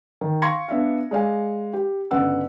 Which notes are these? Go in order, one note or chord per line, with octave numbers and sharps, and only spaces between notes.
D#3
F5 C6 C#6 G#6 A#6 C#7
B3 D4 E5 F5
G#3 D5 F5 G#5
G4
G1 C#3 F#5 E6